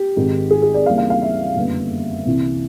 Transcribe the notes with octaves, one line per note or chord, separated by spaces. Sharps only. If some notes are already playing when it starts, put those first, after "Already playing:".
Already playing: G4
G#1 G#2 D#3
G#4
G#4
D5
D#2 C#3 E3 G3 A#3 F5
F5
F5
E5
F#1 F2 D3 G3 B3
C2 C3 E3